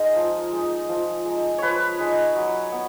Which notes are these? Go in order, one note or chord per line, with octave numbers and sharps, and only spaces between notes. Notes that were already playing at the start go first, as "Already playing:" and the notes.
Already playing: G#3 D#4 A#4
F3
G#3 D#4
F3
G#3 D#4
F3 B4 C#5
G#3 D#4
F#3
B3